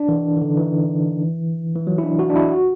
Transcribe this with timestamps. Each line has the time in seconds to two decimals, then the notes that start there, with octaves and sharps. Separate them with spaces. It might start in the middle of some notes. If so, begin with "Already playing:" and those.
Already playing: D4
0.09 E3
0.36 E3
0.41 D3
0.57 E3
1.76 E3
1.87 F#3
1.98 E4
2.03 D4
2.19 F#4
2.30 D4
2.36 E4
2.51 F#4